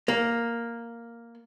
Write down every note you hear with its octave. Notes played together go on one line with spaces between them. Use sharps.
A#3